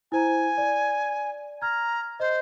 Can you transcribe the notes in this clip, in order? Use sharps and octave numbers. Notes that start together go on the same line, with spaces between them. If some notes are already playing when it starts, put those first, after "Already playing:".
E4 C5 G#5 A#5
D5
A#5 F6 G#6
C5 D#5